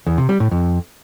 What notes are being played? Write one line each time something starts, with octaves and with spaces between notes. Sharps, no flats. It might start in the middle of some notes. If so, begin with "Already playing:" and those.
E2
C3
G3
A2
F2